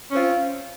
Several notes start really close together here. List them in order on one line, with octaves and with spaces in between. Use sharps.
C#4 C4 F4